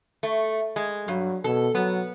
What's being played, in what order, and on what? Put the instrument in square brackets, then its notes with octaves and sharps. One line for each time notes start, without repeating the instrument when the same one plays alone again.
[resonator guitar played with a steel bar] A3
G#3
[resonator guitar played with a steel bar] G2 [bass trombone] F#3
[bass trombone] B2 [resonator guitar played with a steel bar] A4
[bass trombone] F#3 [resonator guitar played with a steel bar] B3